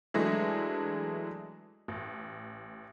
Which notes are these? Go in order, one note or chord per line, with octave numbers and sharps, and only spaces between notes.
E3 F#3 G#3 A3 D4 G#4
A1